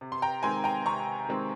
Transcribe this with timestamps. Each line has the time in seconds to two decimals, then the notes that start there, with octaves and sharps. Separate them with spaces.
0.01 C3
0.12 C6
0.22 G5 A#5
0.43 D#3 G#3 C4 G#5 C6
0.64 G5 A#5
0.86 C3 A#5 C#6
1.29 D#3 G#3 C4